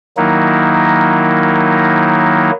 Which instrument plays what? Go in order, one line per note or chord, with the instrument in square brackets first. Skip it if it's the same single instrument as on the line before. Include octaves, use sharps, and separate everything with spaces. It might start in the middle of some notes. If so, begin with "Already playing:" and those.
[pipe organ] D#3 F#3 A#3 D#4 E4